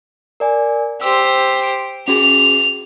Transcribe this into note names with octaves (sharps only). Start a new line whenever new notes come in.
A#4 D5 G#5
G4 C5 E6
D7
C#4 F#4 G#4 F7